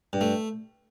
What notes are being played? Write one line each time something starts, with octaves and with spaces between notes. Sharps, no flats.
G2
A3